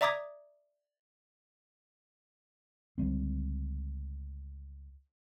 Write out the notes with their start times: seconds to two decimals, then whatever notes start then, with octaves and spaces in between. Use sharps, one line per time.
0.01 D5 E5 A#5 D6 D#6 G#6
2.98 C#2 D3 G3 C4